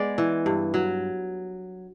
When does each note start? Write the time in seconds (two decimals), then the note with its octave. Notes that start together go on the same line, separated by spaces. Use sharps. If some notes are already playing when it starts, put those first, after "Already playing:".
Already playing: G#3 B3 D5
0.18 E3
0.46 G2
0.74 F#3